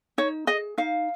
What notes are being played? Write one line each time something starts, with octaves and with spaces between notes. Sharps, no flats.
D#4 C#5
G#4 D#5
D#4 F5